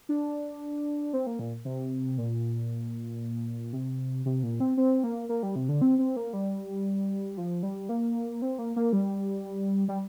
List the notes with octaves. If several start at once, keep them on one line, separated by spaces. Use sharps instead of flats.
D4
C4
A#3
A#2
C3
A#2
C3
C3
A#2
C4
C4
A#3
A#3
G3
C3
D3
C4
C4
A#3
G3
F3
G3
A#3
C4
A#3
A#3
G3
G3